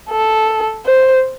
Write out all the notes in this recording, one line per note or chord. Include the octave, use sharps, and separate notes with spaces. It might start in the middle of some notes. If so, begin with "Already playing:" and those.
A4
C5